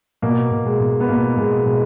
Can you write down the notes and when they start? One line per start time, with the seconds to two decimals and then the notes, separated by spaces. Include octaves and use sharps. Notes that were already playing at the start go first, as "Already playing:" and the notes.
0.22 B2 A#3
0.51 B2
0.66 G#3
0.80 B2
1.00 B3
1.09 B2 A#3
1.37 B2 G#3
1.66 B2 G#3